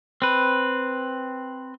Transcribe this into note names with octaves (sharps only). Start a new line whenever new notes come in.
C4 B4